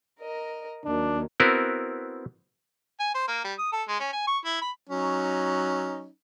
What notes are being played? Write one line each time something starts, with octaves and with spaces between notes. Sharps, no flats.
A#4 D#5
D#2 D#3 F#3 D4
B3 C4 E4 F#4 A#4 B4
G#5
C5
A#3
G3
D#6
A4
G#3
C#4
G#5
C#6
E4
B5
F#3 C#4 D#4